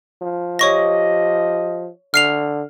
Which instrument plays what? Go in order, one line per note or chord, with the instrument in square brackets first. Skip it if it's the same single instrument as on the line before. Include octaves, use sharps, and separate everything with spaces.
[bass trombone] F3
[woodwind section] G4 D#5 [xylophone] C#5 C#6 A#6
[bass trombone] D3 [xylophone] F6 C7 F7